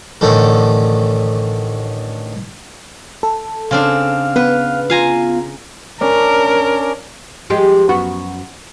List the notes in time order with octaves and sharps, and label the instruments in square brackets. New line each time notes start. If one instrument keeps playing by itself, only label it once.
[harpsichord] A1 D3 D#3 A4
[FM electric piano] A4
[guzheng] C#3 C4 D4 [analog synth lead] F5
[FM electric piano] B3 [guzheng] B4
[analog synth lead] F4 [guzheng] F5 G#5 A#5
[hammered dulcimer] C#4 D4 [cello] A#4
[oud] F3 G#3 G4
F#2 B3 F#4